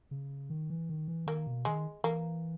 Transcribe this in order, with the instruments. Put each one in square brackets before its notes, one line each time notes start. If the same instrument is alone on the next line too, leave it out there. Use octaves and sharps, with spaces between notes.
[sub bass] C#3
D#3
E3
D#3
E3
[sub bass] D#3 [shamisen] A#3
[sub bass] B2
[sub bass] D#3 [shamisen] G#3
[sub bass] E3 [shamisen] A#3